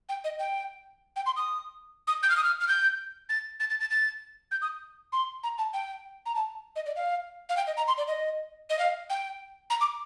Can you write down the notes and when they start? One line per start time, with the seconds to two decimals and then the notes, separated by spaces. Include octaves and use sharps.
0.09 G5
0.24 D#5
0.39 G5
1.16 G5
1.26 C6
1.36 D#6
2.07 D#6
2.23 G6
2.30 F6
2.37 D#6
2.44 F6
2.60 F6
2.68 G6
3.29 A6
3.60 A6
3.70 A6
3.80 A6
3.90 A6
4.51 G6
4.62 D#6
5.13 C6
5.43 A#5
5.58 A5
5.74 G5
6.26 A#5
6.35 A5
6.76 D#5
6.86 D5
6.96 F5
7.49 F5
7.57 G5
7.67 D#5
7.77 A#5
7.88 C6
7.97 D5
8.08 D#5
8.70 D#5
8.79 F5
9.10 G5
9.70 A#5
9.81 D6